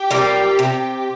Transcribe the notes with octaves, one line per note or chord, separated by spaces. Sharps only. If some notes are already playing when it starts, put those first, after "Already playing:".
Already playing: G4
C3 G3 A#3 F4
C3